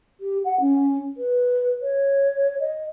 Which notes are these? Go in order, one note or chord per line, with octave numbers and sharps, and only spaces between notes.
G4
F#5
C#4
B4
C#5
D#5